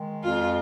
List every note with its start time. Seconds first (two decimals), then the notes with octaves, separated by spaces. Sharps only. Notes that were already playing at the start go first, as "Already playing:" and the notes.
Already playing: D#3 G#3
0.24 F2 F4